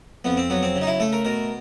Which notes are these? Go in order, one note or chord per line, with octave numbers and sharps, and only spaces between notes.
F2 B3
C4
F#3 B3
C4
C#3
D#4
E4
A3 A4
A#4
B2 A#4